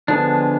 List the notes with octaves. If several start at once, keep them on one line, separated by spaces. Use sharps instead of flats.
D3 F3 G#3 B3 D4